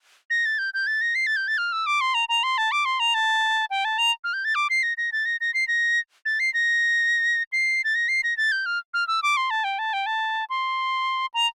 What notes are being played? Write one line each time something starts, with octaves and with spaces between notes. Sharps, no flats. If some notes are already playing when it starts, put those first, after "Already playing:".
A#6
A6
G6
G6
A6
A#6
C7
A6
G6
A6
F6
E6
D6
C6
A#5
A#5
C6
A5
D6
C6
A#5
A5
G5
A5
A#5
F6
G6
A6
D6
C7
A#6
A#6
A6
A#6
A#6
C7
A#6
A6
C7
A#6
C7
A6
A#6
C7
A#6
A6
G6
F6
F6
E6
D6
C6
A5
G5
A5
G5
A5
C6
A#5